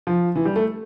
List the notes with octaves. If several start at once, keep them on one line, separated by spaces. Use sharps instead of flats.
F3
E3
G3
A3